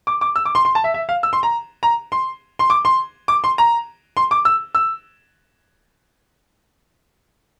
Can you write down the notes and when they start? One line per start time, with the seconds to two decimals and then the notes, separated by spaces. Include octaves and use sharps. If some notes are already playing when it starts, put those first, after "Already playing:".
0.07 D6
0.21 D6
0.36 E6
0.45 D6
0.55 C6
0.65 C6
0.75 A5
0.84 E5
0.94 E5
1.09 F5
1.23 E6
1.33 C6
1.43 A#5
1.83 A#5
2.12 C6
2.59 C6
2.70 D6
2.85 C6
3.28 D6
3.44 C6
3.58 A#5
4.17 C6
4.31 D6
4.45 E6
4.75 E6